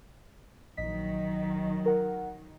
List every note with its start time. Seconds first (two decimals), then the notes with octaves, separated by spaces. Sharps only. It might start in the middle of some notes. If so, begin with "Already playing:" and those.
0.77 A#1 D#3 F#3 D#5 B6
1.86 A#4 F#5